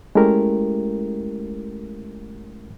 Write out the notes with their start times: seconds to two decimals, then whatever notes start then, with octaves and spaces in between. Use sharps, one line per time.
0.15 G#3 A3 C#4 E4 G4 A#4